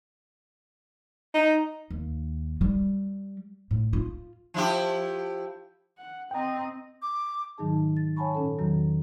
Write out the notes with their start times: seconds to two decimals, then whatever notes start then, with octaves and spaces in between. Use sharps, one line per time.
1.34 D#4
1.90 D#2
2.61 G3
3.71 A2
3.93 F4
4.54 F3 E4 G4
5.98 F#5
6.31 C4 D#5 G5 A#5
7.02 D6
7.58 G#2 D#3 F#3 D#4 G#4 A5
7.97 A6
8.17 C#5 F#5 G#5 A5 B5 C#6
8.35 A#2 C#4 A4
8.59 E2 C3 D#3 F#3 F#4 A#5